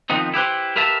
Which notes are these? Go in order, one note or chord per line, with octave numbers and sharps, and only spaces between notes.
D#3 F3 B3 C4 D#4
E4 G4 B4 C5
G4 A#4 B4 E5 F5 A5